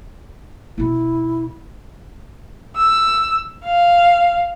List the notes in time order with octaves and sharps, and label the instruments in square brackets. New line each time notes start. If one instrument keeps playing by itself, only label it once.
[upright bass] B2 B3 [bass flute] E4
[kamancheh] E6
F5